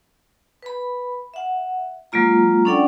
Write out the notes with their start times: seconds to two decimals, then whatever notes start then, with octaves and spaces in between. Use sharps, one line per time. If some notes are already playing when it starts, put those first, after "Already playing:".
0.63 B4 B5
1.34 E5 F#5
2.12 F#3 G#3 A#3 F4 A#5
2.65 C#4 D4 A4 D5 F#5 G5